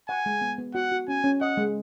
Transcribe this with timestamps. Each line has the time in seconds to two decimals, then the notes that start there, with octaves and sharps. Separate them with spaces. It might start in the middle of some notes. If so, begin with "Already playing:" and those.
0.09 F#5 G#5
0.26 G#3
0.41 B3
0.58 B3
0.74 F#4 F#5
0.92 F#4
1.08 C#4 G#5
1.24 C#4
1.41 D#5 F#5
1.57 G#3